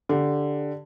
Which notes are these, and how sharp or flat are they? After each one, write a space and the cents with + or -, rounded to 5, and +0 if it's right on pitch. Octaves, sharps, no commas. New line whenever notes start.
D3 +0 G4 +0